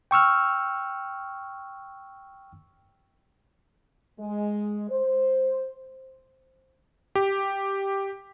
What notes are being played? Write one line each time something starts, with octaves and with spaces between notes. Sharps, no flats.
G5 C#6 E6 F6
G#3
C5
G4